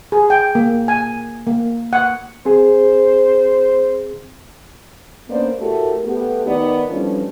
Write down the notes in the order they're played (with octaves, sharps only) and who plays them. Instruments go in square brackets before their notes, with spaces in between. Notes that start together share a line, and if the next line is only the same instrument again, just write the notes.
[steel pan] G#4
G5
A#3
G#5
A#3
F#5
[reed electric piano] C4 G#4 [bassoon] C5
[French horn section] A#3 B3 C#4 D4 C5 D5
A2 A3 F#4 G4 A#4
A3 B3 G4
D#3 B3 D#4 A#4 D5
E3 F3 G3 A3 C#4 D4